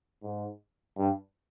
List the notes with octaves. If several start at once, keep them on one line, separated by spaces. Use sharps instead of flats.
G#2
G2